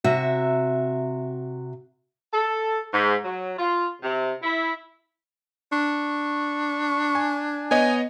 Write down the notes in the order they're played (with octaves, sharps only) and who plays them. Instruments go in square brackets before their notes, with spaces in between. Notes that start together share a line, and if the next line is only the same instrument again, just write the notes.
[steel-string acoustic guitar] C3 F#4 E5
[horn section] A4
G#2
F#3
F4
C3
E4
[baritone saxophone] D4 [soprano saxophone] C#6
[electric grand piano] G#5
[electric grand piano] B3 C#5 D#5 [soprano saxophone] G#5